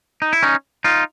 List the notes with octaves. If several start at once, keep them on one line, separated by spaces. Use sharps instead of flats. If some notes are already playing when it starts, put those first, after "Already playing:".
D#4
E4
C#4 D#4
D#4 F4